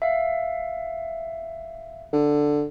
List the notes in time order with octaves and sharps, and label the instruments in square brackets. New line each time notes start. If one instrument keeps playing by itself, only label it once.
[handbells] E5 F5
[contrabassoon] D3